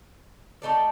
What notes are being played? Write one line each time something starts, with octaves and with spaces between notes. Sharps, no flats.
A3 D#4 A4 D5